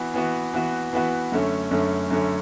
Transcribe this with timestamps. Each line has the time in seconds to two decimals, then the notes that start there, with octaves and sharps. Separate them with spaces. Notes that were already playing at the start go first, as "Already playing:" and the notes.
Already playing: E3 B3 F#4
0.14 E3 B3 F#4
0.54 E3 B3 F#4
0.93 E3 B3 F#4
1.32 F#2 D3 A3 C#4
1.71 F#2 D3 A3 C#4
2.10 F#2 D3 A3 C#4